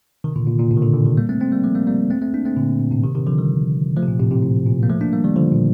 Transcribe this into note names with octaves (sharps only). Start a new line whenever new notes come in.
C3 D#3
A#2 D3
A#2
A#2
A2 C3
D#3
A#2 D3
A#2 D3
C3 D#3
G3 A#3
A3 C4
A3 C4
G3 A#3
F3 A3
G3 A#3
G3 A#3
A3 C4
A3 C4
A#3 D4
A3 C4
A#2 D3
A#2
A2 C3
C3 D#3
C3 D#3
D3 F3
D#3 G3
F3 A3
C3
A#2
A2 C3
A2 C3
A2
A#2
A#3
F3 A3
A#3 D4
G3 A#3
D#3 G3
D3 F3
A#2